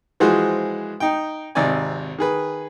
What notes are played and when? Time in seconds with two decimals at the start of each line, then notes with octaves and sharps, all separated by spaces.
0.20 E3 F3 G#3 F#4 G#4 C5
1.00 D#4 G5
1.55 G#1 C3 D#4 D5 G#5
2.18 D#3 G#4 B4